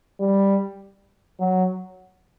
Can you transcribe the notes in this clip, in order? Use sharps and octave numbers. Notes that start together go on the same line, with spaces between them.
G3
F#3